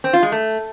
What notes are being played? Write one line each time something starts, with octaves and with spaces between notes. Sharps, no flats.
C4
F4
G#3
A3